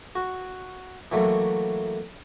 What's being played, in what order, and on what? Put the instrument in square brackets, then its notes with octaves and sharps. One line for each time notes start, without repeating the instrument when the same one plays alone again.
[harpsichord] F#4
E3 F#3 A3 A#3